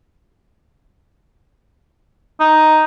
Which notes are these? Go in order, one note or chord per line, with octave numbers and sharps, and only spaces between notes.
D#4